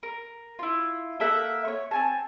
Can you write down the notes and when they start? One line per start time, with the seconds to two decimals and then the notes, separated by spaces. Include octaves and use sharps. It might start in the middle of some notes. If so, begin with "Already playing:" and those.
0.03 A#4
0.59 E4 F4
1.20 A#3 A4 E5 F#5
1.65 C#5 C#6
1.91 C4 G#5 A5